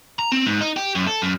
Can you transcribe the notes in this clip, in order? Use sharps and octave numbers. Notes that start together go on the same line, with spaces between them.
A#5
C4
G#2
D#4
G4
F#2
A4
F#2